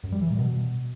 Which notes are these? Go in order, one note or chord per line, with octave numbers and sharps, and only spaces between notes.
F#2
G3
E3
A#2
B2